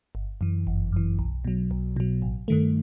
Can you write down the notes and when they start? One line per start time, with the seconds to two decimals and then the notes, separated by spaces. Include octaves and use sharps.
0.15 G1
0.41 F#2 E3
0.67 G1
0.92 F#2 E3
1.19 B1
1.45 B2 F#3
1.71 B1
1.96 B2 F#3
2.22 A1
2.48 G2 D#3 A3